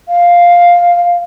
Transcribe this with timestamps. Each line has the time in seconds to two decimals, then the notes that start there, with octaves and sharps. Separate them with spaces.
0.09 F5